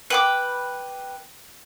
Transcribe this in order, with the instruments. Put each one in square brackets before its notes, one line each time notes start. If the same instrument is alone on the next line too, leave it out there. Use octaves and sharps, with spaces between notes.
[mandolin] B4 G5 D6